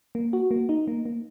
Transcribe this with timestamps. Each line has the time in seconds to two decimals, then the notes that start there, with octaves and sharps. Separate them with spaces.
0.15 A#3
0.33 F#4
0.51 A#3
0.69 D#4
0.88 A#3
1.05 A#3